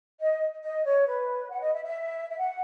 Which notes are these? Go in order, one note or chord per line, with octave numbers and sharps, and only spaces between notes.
D#5
D#5
C#5
B4
F#5
D#5
E5
E5
E5
F#5